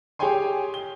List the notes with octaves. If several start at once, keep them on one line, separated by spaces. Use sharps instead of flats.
G4 G#4 C#5 G5 G#5 C6
G7